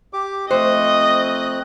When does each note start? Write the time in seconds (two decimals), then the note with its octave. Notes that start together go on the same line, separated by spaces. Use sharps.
0.13 G4 D6
0.51 F2 A3 C4 C5 D#5 E5 C#6 F#6